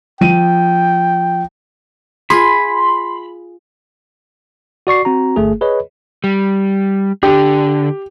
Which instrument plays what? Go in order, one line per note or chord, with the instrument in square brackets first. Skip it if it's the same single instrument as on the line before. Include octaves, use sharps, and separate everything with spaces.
[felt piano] F3 D#7 [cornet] G5
[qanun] F4 G#4 [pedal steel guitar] B5 [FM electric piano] C6
[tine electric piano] F#4 D5 C#6 C7
C4 F#4 A#5
G1 A3 G#4
G#4 B4 C#5 D#5
[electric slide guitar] G3
[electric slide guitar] D3 D4 [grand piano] G4